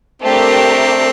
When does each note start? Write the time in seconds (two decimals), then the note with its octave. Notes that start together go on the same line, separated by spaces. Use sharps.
0.22 A3 C4 D4 G4 A#4